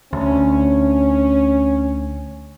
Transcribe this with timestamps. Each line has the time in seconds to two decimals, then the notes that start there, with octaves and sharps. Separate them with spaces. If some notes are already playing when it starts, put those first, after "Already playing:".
0.13 D2 C#4